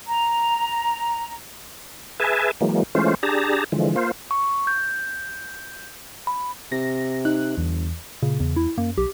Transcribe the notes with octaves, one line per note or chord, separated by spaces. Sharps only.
A#5
G#4 B4 E5 G#5 A5
E3 F#3 G#3 A#3
E3 G#3 A3 C#4 F4 C5
D4 G4 G#4 A5 A#5
D3 E3 F3 G#3
A#3 F4 C5
C#6
G6
B5
C3 A#6
D#4 F#6
G1 E2
A#2 C#3
E2
E4
F#2 A#3
B1 G4